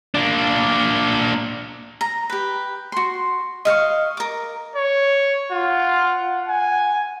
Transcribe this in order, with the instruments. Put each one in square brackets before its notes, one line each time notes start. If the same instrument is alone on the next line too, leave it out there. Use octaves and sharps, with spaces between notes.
[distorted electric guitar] A#3 D4
[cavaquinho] A#5
G4 B4
F#4 C6
D#5 F5 G5 C#6
A#4 D6
[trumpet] C#5
[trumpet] F4 [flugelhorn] F#5
[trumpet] G#5